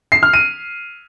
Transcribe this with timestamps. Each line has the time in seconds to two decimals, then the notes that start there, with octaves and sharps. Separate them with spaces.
0.12 C7
0.23 F6
0.34 D#7